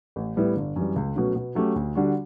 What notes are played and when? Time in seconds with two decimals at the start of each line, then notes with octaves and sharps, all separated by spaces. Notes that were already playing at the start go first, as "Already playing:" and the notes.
0.16 A1
0.36 A2 G3 B3 E4
0.56 G1
0.76 F#2 E3 G3
0.96 C#2
1.16 B2 F#3 A3 C#4
1.36 B2
1.55 F#3 A3 C#4 G4
1.76 D2
1.95 D3 G3 D4 F#4